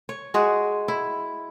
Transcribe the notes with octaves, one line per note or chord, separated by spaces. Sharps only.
C#5
G#3 F#4 G#4
E4